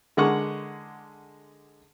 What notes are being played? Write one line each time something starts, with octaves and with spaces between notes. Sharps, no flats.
D3 G#3 A#4 F#5 C#6 D6